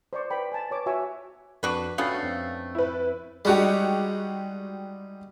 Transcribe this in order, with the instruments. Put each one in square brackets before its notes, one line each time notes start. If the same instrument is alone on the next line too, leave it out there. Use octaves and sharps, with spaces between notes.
[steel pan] C5 D5 C#6
B4 D5 G5 B5
G#5 A5
B4 C#5 D6
F#4 C#5 E5 G#5 C#6 E6
[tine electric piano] F2 [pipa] D4 F#4 B4
[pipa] A3 B3 C#4 [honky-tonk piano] D4 F5 [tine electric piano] F#4 G5 C7
[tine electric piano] F2 C4
[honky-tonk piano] E4 B4
[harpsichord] G3 D#4 [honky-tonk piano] G#3 F#4 G4